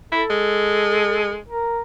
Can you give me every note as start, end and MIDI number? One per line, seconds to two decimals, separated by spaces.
0.12 0.23 64
0.12 1.35 69
0.30 1.37 56
1.49 1.81 70